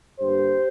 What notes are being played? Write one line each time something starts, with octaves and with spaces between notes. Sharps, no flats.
G2 D3 A#3 G4 C5